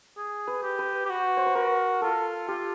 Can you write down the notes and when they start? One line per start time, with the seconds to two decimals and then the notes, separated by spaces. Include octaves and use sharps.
0.17 G#4
0.47 B4
0.62 G4
0.79 B4
1.05 G4
1.09 F#4
1.37 C5
1.46 B4
1.55 F#4 A#4
2.02 F4 A4
2.48 F4 G4